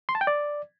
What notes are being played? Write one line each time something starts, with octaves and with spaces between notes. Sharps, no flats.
C6
A5
G5
D5